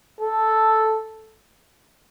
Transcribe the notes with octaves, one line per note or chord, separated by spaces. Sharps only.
A4